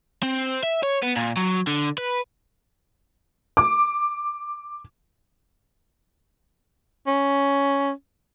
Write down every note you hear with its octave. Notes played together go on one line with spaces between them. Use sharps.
C4
E5
C#5
B3
A#2
F#3
D3
B4
D6
C#4